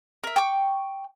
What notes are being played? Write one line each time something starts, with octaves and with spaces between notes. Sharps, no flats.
A#4 E5
G5 C#6 D6